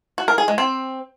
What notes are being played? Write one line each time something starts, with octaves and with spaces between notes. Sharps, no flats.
F#4
A#4
G#4
G#3
C4